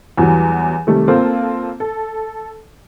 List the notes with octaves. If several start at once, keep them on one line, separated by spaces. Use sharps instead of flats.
E2 E3 F#3 G3
C3 D#3 G3 A3
A#3 C4 F4 A4 C5
A4